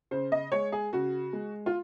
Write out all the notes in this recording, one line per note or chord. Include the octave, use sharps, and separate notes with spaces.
C#3 C5
D#5
G#3 C#5
G#4
C#3 F#4
G#3
F4